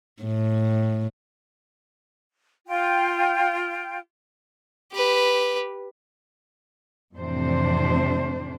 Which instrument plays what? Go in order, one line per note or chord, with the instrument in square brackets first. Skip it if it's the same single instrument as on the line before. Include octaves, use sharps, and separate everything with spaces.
[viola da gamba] A2
[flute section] F4 G5
[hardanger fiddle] G4 B4
[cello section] F2 A2 C3 E3 D4 C5